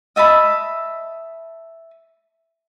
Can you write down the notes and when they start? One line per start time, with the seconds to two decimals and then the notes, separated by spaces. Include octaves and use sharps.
0.16 D#5 E5 A5 B5